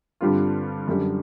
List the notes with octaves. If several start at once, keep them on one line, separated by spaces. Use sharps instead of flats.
G2 D3 G3 C4 F4
F#2 D3 G3